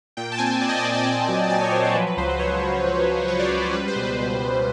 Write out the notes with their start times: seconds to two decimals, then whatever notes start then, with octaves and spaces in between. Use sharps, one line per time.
0.17 A#2 G5
0.32 A5
0.38 C4 G#5
0.61 A#2 D5
0.69 D#5
0.78 D5
0.84 C4 D#5
0.94 D5
1.02 D#5
1.05 C4
1.11 D5
1.28 F#3
1.50 F#3 D5
1.61 C#5
1.72 F#3 C5
1.84 C5
1.95 F3 B4
2.07 B4
2.17 C#2 C5
2.29 B4
2.39 C#2 C#5
2.62 F3
2.84 C#2
3.07 F3
3.28 F3 C#5
3.39 D5
3.50 C#2 D5
3.63 C5
3.73 G3 B4
3.88 C5
3.96 B2
4.03 B4
4.17 B2
4.41 B2